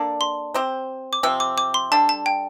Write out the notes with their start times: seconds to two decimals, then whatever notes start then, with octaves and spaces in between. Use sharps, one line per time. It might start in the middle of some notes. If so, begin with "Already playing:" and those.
Already playing: A#3 D4 A4 D5
0.21 C6
0.54 C4 G4 C5
1.13 D6
1.23 C3 F3 C4 E6
1.40 D6
1.58 D6
1.74 C6
1.92 G3 D4 A4 A5
2.09 A5
2.26 G5